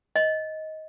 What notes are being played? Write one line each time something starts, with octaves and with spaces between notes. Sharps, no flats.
D#5